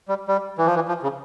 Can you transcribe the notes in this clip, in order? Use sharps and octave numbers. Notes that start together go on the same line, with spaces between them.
G3
G3
E3
F3
E3
F3
C#3